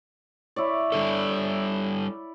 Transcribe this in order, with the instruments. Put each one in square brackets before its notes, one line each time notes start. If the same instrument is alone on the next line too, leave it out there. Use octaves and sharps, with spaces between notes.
[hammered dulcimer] E4 C#5 D5
[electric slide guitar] G3 D4 A4